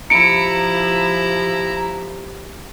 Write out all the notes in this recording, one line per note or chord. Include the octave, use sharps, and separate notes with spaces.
F3 E4 G4 A#5 C#7 D7